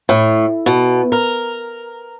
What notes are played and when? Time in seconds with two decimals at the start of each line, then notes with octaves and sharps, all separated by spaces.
0.09 A2
0.66 B2
1.12 A#4